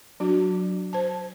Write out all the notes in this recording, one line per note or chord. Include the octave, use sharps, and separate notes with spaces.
F#3 D4 F#4
C5 A5